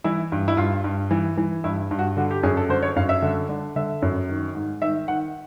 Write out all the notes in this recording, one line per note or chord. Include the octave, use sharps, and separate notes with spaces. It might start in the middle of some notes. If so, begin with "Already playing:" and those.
E3 E4
G2
E4
G2 F4
G2
E3
E3
G2 E4
G2
F#4
D3 F#4
G4
F#2 G#4
A4
D3 C5
C#5
F#2 F5
E5
D3
D3
D3 E5
F#2
D#3
G#2
D#3 E5
D#3 F#5